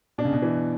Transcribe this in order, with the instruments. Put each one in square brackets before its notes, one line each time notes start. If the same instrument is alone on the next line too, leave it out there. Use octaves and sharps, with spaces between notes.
[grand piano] B2 [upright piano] D4
[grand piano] C#3
B2
[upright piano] E3